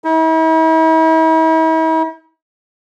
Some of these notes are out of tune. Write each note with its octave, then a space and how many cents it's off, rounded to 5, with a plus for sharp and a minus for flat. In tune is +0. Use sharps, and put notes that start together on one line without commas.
E4 -45